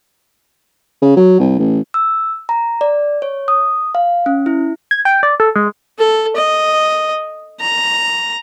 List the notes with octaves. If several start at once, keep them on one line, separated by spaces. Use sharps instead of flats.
C#3
F#3
C2
A1
E6
A#5
D5
C#5
D#6
F5
C#4
E4
G#6
G5
D5
A4
G#3
A4
D#5
A#5